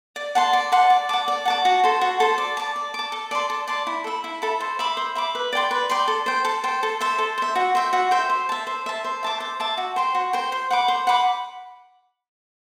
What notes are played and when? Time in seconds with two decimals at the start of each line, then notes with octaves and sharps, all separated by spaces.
0.16 D5
0.35 F#5 A5 C6
0.53 D5
0.72 F#5 A5 C6
0.90 D5
1.09 F#5 A5 D6
1.28 D5
1.45 F#5 A5 D6
1.65 F#4
1.84 A4 C5
2.01 F#4
2.20 A4 C5
2.38 D5
2.57 A5 D6
2.76 D5
2.94 A5 D6
3.12 A4
3.31 D5 A5 C6
3.50 A4
3.68 D5 A5 C6
3.87 E4
4.04 A4 E5 B5
4.24 E4
4.42 A4 E5 B5
4.60 C5
4.79 E5 B5 D6
4.97 C5
5.15 E5 B5 D6
5.35 B4
5.53 D5 G5 C6
5.71 B4
5.89 D5 G5 C6
6.08 A4
6.26 C5 G5
6.45 A4
6.64 C5 G5
6.83 A4
7.01 C5 E5
7.19 A4
7.38 C5 E5
7.56 F#4
7.75 C5 E5 G5
7.93 F#4
8.11 C5 E5 G5
8.30 C5
8.49 E5 A5
8.67 C5
8.86 E5 A5
9.04 C5
9.23 E5 A5 D6
9.40 C5
9.60 E5 A5 D6
9.77 F#4
9.96 C5 G5 C6
10.15 F#4
10.33 C5 G5 C6
10.52 C5
10.70 F#5 B5 D6
10.88 C5
11.07 F#5 B5 D6